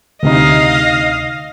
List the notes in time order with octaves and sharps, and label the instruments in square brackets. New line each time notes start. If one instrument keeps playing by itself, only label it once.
[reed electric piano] D2 C3 D#4 [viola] D#5 F5